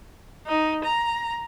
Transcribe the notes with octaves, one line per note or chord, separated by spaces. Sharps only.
D#4
A#5